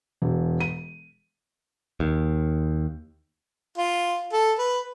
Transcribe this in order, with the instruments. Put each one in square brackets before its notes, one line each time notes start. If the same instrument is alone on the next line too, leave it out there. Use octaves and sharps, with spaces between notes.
[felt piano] E1
D#7
[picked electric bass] D#2
[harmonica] F4
A4
B4